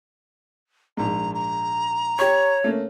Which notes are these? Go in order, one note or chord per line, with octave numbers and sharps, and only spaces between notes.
A#1 G#2 A#5
A#5
G4 C#5 C#6
A3 A#3 C#4